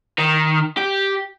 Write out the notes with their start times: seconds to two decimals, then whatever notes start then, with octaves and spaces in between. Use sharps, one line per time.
0.18 D#3
0.77 G4